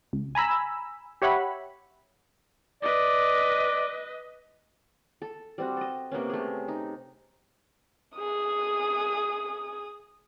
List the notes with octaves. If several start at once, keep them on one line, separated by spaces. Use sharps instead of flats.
C#2
G#5 A#5 B5 E6
G4 C#5 E5 F#5 B5
B4 D5 D#5
A4
G3 C4 F#4
A4 D#5
C3 A#3 B3 C#4
A3 G#4
D#4
G#4 D#6